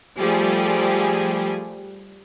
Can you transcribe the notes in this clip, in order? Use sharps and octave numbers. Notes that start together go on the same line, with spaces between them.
F3 G3 A3 G4 G#4